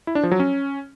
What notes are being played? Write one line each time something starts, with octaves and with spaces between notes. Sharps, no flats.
E4
D4
F3
F#3
C#4